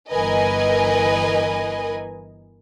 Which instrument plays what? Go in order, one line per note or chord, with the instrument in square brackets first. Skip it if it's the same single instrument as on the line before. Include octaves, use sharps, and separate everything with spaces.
[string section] G1 E3 A#4 B4 D#5 G#5